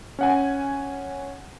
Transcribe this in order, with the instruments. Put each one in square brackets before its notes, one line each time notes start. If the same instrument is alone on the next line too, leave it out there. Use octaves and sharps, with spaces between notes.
[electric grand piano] C#4 F#5 G#5